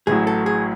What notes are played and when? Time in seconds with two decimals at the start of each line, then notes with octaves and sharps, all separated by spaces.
0.07 A1 A2 F#3 G#4
0.27 A4
0.46 G#4